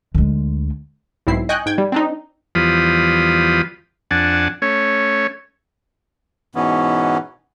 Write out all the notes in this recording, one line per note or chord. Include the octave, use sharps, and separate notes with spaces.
D2 G#3
B1 G#2 C4 E4 C7
D#5 G5 G#5 C#6 F#6 G6
G#2 G5 G#6
G3
C4 D4 D#4
E2 F3 G3 F4 B5 D#6
F2 D4 F#5 G#5 A5
A3 C#4 C#5
G#2 B2 E3 B3 C#4